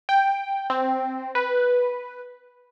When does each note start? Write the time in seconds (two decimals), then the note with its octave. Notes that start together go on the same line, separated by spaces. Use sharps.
0.09 G5
0.70 C4
1.35 B4